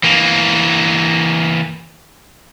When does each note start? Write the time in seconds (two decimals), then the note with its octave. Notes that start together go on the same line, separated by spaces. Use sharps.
0.03 E3 A#3